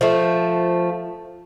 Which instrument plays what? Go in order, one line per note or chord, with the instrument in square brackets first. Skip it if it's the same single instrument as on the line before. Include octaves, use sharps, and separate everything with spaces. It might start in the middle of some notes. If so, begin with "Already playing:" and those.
[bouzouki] F3 A3